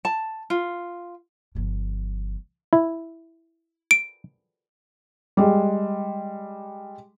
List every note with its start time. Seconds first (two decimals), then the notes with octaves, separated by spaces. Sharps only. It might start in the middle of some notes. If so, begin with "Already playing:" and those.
0.05 A5
0.50 F4
1.55 G1 F3
2.73 E4
3.91 D7
5.37 G3 G#3